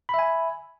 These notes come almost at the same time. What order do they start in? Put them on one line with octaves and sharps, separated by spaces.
B5 E5 G#5